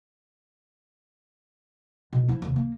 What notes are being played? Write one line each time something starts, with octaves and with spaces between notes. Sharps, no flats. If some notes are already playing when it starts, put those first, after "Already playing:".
B2
F3 E4
D#2 C3
A#3